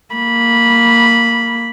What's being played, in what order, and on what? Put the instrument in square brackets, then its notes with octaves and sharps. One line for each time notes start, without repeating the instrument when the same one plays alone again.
[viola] A#3 B5